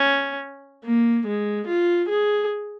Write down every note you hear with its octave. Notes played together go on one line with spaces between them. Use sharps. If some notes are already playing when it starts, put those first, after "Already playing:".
Already playing: C#4
A#3
G#3
F4
G#4